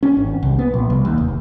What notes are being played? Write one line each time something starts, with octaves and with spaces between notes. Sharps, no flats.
C#4
G#1
C2
B3
A#1
C2
D#2
F1